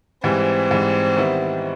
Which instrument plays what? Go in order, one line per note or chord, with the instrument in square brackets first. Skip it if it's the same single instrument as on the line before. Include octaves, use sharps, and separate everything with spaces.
[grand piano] G#2 E3 G3 [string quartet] C4
[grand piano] G#2 E3 G3
D#3 G3 B3 E4